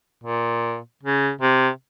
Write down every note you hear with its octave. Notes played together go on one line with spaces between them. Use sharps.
A#2
C#3
C3